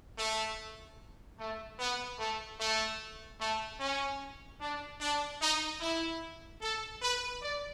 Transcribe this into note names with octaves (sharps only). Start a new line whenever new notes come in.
A3
A3
B3
A3
A3
A3
C#4
D4
D4
D#4
E4
A4
B4
D5